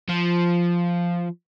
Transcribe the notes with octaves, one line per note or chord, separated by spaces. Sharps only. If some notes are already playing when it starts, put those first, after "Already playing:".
F3